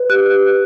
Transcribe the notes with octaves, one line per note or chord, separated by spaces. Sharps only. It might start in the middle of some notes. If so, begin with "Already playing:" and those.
Already playing: B4
G4 F#6